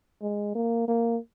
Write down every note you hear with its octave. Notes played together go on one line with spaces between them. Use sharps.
G#3
A#3
A#3